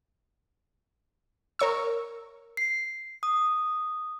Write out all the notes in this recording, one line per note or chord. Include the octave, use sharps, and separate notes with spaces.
A#4 C#5 C#6 E6
C7
D#6